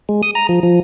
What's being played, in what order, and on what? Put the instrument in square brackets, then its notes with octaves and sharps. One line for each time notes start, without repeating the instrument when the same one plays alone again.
[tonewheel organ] G#3
D#6
A#5
F3
F3